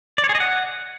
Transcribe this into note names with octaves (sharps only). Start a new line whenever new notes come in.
D5
C#5
G#4
D#5
F#5